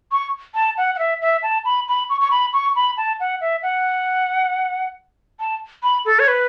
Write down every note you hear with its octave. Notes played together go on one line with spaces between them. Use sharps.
C#6
A5
F#5
F#5
E5
E5
A5
B5
B5
C#6
C#6
B5
C#6
B5
A5
F#5
E5
F#5
A5
B5
A4
C#5
B4